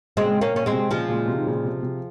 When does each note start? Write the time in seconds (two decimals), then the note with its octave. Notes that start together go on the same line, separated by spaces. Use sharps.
0.17 A#2 C#3 G#3 C4
0.35 A#2
0.41 A#3 C#4
0.54 A#2 C#4
0.66 G#3 C4
0.72 C3
0.91 A#2 C#3 F3 G#3
1.09 A#2 C#3
1.28 C3
1.38 D#3
1.46 A#2 C#3
1.65 C3
1.83 C3